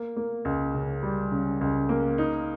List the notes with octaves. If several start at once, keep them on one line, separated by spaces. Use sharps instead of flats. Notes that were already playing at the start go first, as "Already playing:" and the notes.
Already playing: A#3
A#3
C#2
C#3
G3
C#3
C#2
A#3
D#4